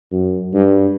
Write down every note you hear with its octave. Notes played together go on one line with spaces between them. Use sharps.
F#2
G2